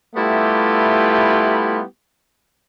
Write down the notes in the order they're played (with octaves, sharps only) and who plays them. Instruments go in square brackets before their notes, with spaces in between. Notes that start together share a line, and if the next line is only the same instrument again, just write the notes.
[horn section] G3 A3 B3 E4 F4 G4